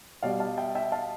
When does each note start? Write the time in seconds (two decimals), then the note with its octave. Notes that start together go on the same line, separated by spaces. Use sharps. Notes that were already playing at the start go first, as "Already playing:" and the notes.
0.23 B2 G3 D5 F5
0.40 F5 A5
0.57 E5 G5
0.75 E5 G5
0.92 F5 A5